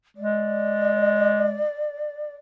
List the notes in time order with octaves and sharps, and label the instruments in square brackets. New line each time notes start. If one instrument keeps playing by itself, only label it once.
[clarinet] G#3 [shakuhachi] D5